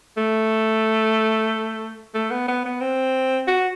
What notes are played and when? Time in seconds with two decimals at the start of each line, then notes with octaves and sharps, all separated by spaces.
0.17 A3
2.14 A3
2.31 B3
2.48 B3
2.65 B3
2.81 C4
3.47 F#4